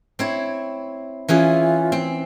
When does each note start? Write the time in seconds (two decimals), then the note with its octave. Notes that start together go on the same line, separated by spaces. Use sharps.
0.19 C4 E4 C#5
1.28 E3 C#4 F4 G#4 E5
1.92 C4